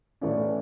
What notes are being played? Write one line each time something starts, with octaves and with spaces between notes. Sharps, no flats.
A2 E3 A3 C#4 D5